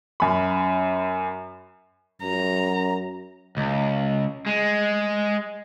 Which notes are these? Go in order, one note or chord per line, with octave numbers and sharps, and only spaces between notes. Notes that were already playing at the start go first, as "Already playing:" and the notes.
F#2 B5
F#2 A#5
C#2
G#3